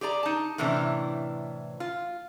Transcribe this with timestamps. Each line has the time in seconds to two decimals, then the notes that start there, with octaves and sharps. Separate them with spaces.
0.01 G4 G#4 D5 A#5
0.23 D#4 A5
0.58 A2 C3 E3 C#4 D4
1.80 F4